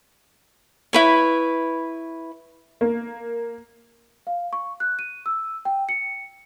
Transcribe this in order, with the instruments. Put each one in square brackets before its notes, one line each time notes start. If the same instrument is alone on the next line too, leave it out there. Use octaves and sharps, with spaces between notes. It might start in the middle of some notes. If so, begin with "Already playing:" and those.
[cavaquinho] E4 B4 C#5
[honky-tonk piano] A#3
[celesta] F5
C#6
F#6
D#7
E6
G5
C#7